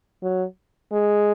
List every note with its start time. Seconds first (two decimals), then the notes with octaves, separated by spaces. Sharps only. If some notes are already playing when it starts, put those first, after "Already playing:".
0.22 F#3
0.92 G#3